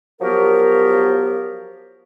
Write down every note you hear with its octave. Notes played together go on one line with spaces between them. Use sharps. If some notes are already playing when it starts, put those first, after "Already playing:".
F3 F#3 B3 F#4 G4 A#4